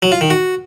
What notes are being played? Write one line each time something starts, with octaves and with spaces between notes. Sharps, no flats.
F#3
F4
D#3
F#4